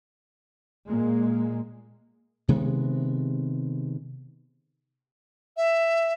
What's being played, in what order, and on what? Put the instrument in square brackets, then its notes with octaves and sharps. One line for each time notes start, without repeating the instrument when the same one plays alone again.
[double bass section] A#2 G#3 A#3
[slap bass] C3 D#3 G#3 B3
[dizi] E5